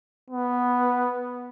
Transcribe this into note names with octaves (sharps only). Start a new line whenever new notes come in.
B3